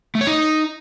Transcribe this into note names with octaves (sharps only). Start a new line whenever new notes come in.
A3
C#5
D#4